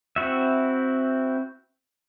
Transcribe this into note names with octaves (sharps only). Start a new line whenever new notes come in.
C4 E4 F#4 E5